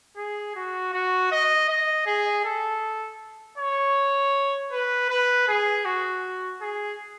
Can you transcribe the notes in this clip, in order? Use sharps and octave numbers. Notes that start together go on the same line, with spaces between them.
G#4
F#4
F#4
D#5
D#5
G#4
A4
C#5
B4
B4
G#4
F#4
G#4